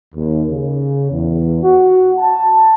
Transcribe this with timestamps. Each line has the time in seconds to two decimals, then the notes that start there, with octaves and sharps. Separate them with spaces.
0.15 D#2
0.50 C#3
1.11 E2
1.63 F#4
2.18 A5